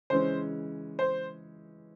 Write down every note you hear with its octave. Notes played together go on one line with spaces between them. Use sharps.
C#3 E3 G#3 C#4 C5
C5